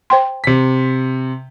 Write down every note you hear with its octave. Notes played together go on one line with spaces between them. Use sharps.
C5 G5 C6
C3 B6